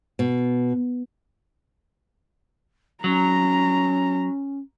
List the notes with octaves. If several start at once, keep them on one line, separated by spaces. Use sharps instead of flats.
B2
F#3 C#4 A#5